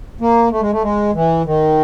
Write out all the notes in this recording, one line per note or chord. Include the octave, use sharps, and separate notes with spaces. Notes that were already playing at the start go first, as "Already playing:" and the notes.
A#3
A3
G#3
A3
G#3
E3
D#3